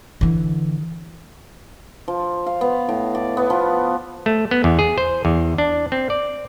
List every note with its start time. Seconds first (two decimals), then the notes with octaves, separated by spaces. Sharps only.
0.21 D3 E3
2.08 F3
2.46 F5
2.61 B3
2.89 A2
3.15 D5
3.37 B3
3.50 F3
4.26 A3
4.51 B3
4.64 E2
4.79 G#4
4.98 C5
5.25 E2
5.58 D4
5.92 C4
6.10 D5